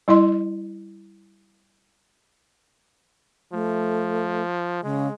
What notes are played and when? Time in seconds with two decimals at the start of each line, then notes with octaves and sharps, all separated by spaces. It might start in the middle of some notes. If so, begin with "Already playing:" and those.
0.08 G3 E4 D#5 C6
3.53 F3 A3
4.83 C#3 G#3